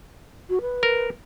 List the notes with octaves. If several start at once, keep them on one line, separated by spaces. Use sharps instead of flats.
F#4
B4
A#4